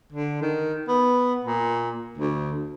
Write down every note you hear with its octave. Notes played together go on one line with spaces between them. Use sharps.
D3
D#3
B3
A#2
D2